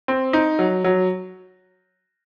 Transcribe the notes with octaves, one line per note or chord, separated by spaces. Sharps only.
C4
D#4
F#3
F#3